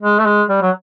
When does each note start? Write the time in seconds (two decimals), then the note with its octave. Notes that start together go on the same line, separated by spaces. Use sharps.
0.02 G#3
0.20 A3
0.26 G#3
0.49 G3
0.62 F#3